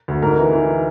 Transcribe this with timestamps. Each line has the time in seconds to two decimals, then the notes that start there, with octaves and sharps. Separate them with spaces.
0.08 D2
0.22 G#2 A#4
0.38 E3
0.53 E3